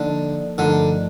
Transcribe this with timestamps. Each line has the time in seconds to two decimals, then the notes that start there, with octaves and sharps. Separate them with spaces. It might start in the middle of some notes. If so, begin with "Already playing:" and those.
Already playing: D3 F3 A#3 D#4 A4 D#5
0.58 G2 D3 F3 A3 D#4 A#4